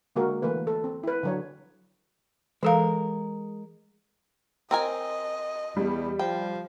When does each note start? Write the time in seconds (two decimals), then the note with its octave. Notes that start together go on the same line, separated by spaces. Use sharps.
0.16 D3 G#3 A#3 F#4 A#4
0.42 E3 A3 A#3 B4
0.67 A4
0.84 C4
1.04 E4 B4
1.23 D3 F#3 C#5
2.63 E3 G#3 A4 A#4 F5
4.71 C4 A#4 D#5 G#5
5.77 E2 G3
6.19 F3 G5